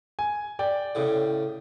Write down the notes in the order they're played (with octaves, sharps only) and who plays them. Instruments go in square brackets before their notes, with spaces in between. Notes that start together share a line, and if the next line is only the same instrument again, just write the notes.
[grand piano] G#5
D5 G5
[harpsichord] A2 C#3